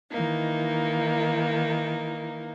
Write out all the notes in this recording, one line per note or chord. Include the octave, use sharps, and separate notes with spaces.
D#3 E3 A#3 D#4